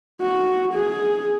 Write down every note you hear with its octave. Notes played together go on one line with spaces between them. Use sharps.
F#4
G#4